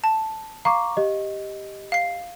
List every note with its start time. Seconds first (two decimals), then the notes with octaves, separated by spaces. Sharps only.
0.04 A5
0.65 F5 A#5 C#6 D6
0.97 G4 D#5
1.92 F5 C7